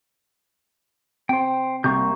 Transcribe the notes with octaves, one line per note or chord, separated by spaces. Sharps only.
C4 C5 G5
C2 C3 A#3 C#6 G6